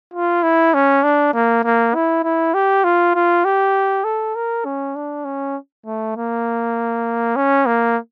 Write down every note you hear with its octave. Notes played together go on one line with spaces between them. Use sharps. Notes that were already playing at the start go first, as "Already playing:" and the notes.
F4
E4
C#4
D4
A#3
A#3
E4
E4
G4
F4
F4
G4
A4
A#4
C#4
D4
C#4
A3
A#3
C#4
A#3